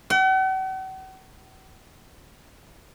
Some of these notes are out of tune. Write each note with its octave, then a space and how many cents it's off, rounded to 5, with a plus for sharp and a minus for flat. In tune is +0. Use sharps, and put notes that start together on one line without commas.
F#5 +45